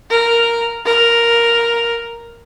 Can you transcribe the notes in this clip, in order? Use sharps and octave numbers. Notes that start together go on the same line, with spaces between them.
A#4
A#4